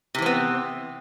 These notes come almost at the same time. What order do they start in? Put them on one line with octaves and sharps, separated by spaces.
C3 E3 C4 B3